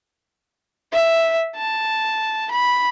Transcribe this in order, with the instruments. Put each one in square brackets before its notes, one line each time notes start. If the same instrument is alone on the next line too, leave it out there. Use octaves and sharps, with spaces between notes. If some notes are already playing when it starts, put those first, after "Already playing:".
[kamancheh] E5
A5
B5